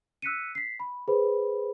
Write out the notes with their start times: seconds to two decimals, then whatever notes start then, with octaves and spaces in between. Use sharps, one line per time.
0.22 E6 F#6 B6 C#7 D#7
0.55 B6 C7
0.80 B5
1.08 G#4 B4 C5 B5